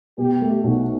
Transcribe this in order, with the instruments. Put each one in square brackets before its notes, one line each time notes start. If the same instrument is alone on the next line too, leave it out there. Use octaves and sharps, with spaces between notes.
[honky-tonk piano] B2 [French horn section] G4
[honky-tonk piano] A3
[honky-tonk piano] B1 [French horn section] F#4